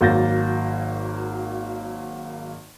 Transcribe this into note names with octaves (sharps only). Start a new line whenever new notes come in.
G#1 F#3 A#3 G6 A6 A#6